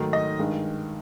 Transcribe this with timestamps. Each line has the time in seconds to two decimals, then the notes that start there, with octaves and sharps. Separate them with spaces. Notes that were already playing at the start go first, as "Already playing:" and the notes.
Already playing: G#2 D#3 F#3 A3
0.13 D#5
0.39 G2 D#3 G#3